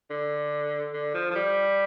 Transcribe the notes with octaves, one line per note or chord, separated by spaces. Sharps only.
D3
D3
F3
F3
G3